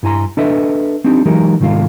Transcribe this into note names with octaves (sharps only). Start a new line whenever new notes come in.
G2 E4 G#5 A#5 C6
D4 A4 B4 D#5 E5
C4 D4 D#4 G4
E3 F#3 G#3 D#4 G4 A#4
C2 G#2 D#3 G#3 F4 F5